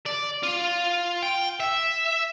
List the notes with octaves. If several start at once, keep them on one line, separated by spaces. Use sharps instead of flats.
D5
F4
G5
E5